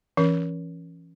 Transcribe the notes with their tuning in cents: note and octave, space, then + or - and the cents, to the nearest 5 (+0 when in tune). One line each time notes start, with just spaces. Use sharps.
E3 +25 C#4 +0 A#4 +30